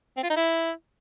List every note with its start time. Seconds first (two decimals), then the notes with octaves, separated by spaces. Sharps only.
0.17 C4
0.23 F4
0.30 D#4
0.36 E4